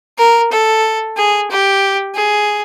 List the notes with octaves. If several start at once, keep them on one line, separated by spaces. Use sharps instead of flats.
A#4
A4
G#4
G4
G#4